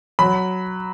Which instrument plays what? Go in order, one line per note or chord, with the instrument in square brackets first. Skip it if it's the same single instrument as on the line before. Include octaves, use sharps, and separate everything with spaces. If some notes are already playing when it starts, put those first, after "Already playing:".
[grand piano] F#3 B5